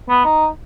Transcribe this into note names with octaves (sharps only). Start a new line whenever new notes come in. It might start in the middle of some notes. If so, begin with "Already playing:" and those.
B3
D#4